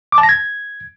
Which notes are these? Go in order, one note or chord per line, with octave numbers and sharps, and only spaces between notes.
D6
A5
A#6
G#6